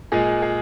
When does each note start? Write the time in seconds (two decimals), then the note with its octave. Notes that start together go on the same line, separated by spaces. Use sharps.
0.12 A#2 G#3 G#4
0.42 G#4